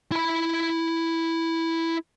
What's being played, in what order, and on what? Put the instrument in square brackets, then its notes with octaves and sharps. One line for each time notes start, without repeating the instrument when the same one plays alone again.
[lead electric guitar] E4 B5